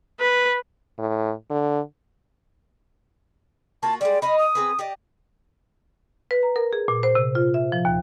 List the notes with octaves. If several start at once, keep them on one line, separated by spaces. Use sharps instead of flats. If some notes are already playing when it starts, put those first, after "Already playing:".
B4
A2
D3
A#3 F4 F#4 A5
G3 G#3 D5
D#4 D#5 F5 B5
D#6
C4 G#4 B4
G4 D5 D#5
B4
A#5
A#4
G#4
A#2
C5
C3
F4
E5
F3
D#2